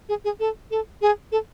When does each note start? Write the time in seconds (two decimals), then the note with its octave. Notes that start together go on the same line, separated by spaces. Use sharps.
0.09 G#4
0.24 G#4
0.40 A4
0.71 A4
1.02 G#4
1.32 A4